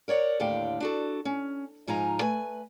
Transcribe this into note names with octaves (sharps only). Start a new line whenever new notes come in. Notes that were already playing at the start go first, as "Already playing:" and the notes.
A#4 C#5 D5 F#5
D#2 A2 D3 G4 F5 G5
D4 F#4 A4
C#4
G#2 F3 D#4 G#5 A#5
A3 B4 G#5